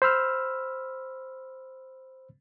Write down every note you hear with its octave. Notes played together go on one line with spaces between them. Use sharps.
C5 B5 E6 F6